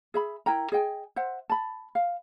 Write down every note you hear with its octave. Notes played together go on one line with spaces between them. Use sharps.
G#4 E5 B5
E4 A#4 G5 A#5
G#4 D#5 G5 G#5
C5 E5 F#5
A5 B5
F5